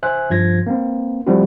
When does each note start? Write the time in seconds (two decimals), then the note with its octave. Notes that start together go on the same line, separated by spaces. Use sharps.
0.03 C5 E5 G#5 F#6
0.30 G2 F3 G#6 A#6
0.66 A#3 C4
1.26 F3 G3 A3 C4 E4 F#4